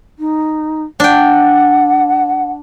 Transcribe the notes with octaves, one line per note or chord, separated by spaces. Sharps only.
D#4
D4 F#5 G5